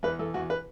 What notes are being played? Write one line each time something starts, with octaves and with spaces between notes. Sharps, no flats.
E2 B4
E2 A4
E2 F#4
B4